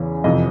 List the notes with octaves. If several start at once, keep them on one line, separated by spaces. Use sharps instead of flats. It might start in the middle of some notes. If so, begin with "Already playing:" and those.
Already playing: E2 C#3 E3
F2 C3 E3 D#5